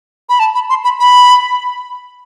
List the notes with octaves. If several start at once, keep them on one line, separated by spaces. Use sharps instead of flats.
B5
A5
B5
C6
B5
B5